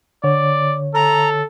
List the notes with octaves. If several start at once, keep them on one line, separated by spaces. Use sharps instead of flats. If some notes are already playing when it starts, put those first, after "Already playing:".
D3 C#5 D5
A4 A#5